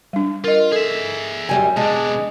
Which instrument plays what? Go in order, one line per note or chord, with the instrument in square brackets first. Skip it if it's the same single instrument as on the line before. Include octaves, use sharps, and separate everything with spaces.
[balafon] G3 D4
[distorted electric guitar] F4 [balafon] A#4 D#5
[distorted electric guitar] G#4 E5 [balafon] A4
[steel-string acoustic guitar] F#2 G3 G#5
[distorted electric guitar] B2 D4 [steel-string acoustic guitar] G#3 [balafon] A5